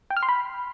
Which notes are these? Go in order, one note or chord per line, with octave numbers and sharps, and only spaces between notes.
G5
F6
C6
B5